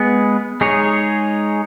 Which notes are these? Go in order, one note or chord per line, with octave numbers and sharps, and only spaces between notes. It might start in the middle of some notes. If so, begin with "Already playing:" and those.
Already playing: G#3 B3 G#4 B4
G#3 D#4 G#4 C#5